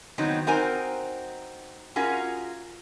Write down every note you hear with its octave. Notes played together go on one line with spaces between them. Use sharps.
D#3 F#3 B3 C4 D#4
C4 D#4 F#4 A#4 C5 G#5
C#4 F4 F#4 G#4 A#4